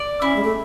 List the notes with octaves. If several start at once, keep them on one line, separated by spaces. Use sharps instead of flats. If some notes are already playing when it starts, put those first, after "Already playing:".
Already playing: D5
C#4 E4
G#3
A3